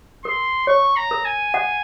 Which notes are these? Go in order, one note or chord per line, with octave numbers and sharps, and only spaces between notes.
A#4 C6
C#5 C#6
A#5
A#4
G#5
F#5